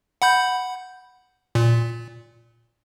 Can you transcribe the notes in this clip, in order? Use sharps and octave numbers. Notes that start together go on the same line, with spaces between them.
F#5 B5 G6
A#2